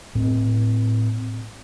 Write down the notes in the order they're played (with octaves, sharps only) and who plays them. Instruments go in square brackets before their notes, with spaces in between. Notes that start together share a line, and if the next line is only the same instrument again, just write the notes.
[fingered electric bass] A2 A3 C4